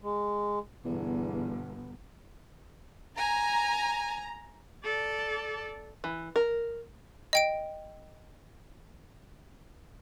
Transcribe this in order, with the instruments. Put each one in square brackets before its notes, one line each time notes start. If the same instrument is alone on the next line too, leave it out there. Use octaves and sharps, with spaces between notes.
[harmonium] G#3
[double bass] G1 B2 [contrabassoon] E2
[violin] G#5 [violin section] A#5
[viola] A4 D5
[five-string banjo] E3
A#4
[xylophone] D#5 G5 D7